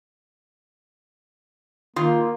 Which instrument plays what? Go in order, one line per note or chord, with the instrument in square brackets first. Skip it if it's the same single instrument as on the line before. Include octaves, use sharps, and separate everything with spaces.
[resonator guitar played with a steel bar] D#3 F4 [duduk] A#3